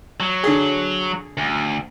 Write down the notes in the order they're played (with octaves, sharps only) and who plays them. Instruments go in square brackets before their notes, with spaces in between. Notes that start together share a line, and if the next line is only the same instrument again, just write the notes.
[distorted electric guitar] F#3
[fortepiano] D3 G#4
[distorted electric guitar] D2